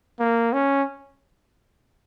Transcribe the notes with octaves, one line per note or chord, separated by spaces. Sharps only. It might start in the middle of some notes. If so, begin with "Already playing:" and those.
A#3
C#4